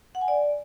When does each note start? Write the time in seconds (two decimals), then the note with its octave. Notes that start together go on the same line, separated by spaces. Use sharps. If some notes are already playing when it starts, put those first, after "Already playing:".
0.15 F#5
0.21 G#5
0.28 D5